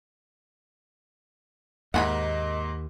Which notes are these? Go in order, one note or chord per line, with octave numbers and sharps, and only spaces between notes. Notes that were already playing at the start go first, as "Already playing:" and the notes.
D#2 G#2 A#3 D#5 F#5 G#5 B5